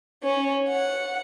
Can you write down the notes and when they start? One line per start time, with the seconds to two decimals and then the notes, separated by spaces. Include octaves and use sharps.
0.23 C#4
0.70 F#5